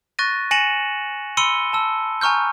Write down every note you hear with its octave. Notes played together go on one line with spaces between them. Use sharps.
C#6 F#6 A6 A#6 D#7
G#5 A#6 C#7 D#7 E7 F#7
B5 C6 E6 C#7 D#7 G7
A5 E6
G#5 A#5 C#6 F6 G6